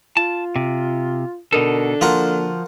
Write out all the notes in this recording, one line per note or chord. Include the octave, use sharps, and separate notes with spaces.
F4 A5
C3
B2 D3 D#4 A4 A#4
F3 A#3 F4 F#4 A#4